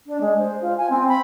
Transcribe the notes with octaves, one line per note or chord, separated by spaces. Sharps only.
D4
G#3
C5
F4
G#5
C4
B5